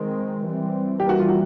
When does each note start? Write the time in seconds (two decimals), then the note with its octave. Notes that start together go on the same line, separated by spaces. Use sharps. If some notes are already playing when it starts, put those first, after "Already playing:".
Already playing: D#3 G#3 C4
0.43 E3 G3 C4
1.00 E3 G3 A#3 G4
1.09 F#4
1.19 F4
1.28 F#4